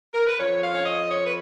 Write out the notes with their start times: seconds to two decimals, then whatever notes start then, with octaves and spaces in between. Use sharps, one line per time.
0.14 A#4
0.27 B4
0.40 F2 F3 C#5
0.63 F5
0.75 C#5
0.85 D#5
1.09 C#5
1.25 B4